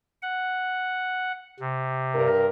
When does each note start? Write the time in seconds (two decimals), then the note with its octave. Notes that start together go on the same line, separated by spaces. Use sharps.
0.22 F#5
1.60 C3
2.15 G2 A#4